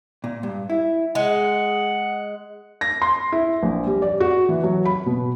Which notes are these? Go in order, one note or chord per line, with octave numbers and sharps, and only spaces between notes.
A#2
G2
E4
G#3 F#5
A#6
C6
E4
A#1
G3
D5
F#4
E3
F#3
B5
B2